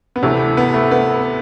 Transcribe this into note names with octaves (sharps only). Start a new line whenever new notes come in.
B3
D2 C3 E3 A3
B3
A3
B3